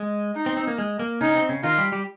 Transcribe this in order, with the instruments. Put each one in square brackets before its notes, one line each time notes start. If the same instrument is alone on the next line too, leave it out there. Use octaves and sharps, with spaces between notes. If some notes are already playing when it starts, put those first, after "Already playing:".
Already playing: [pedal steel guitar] G#3
[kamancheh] D#4
[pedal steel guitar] C4
C4
A#3
G#3
A#3
[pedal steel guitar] C#3 C#4 [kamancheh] D#4
[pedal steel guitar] C4
C#3 C#4
[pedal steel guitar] D#3 D#4 [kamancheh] F4
[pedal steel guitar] G3 G4
G3 G4